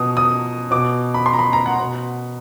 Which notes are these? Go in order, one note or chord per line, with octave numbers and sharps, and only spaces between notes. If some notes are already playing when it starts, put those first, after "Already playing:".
Already playing: B2 D#6
D#6
B2 D6
B5
C6
A#5
B5
A#5
F#5
B2